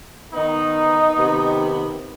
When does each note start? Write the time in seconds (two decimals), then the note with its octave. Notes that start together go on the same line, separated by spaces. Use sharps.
0.33 D#3 B3 D#4
1.17 C3 D#3 B3